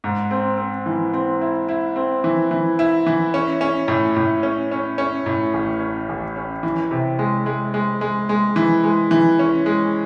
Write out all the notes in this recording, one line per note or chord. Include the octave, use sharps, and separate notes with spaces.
G#2
C4
C4
E3
C4
E4
E4
C4
E3
E3
E4
E3
C#4
C#4
A2
A2
C#4
C#4
C#4
A2
A1
C#4
A1
C#4
E3
C3
G#3
G#3
G#3
G#3
G#3
E3
G#3
E3
C#4
G#3